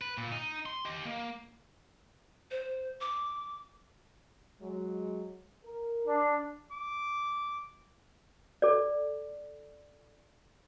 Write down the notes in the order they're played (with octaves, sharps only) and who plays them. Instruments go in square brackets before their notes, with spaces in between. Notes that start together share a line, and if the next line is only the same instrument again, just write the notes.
[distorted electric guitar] B4
A#2
D#4
C6
G4 D#5
A#3
[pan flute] C5
D6
[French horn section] F#3 G#3
A#4
[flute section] D4
[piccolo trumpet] D6
[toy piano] A4 D5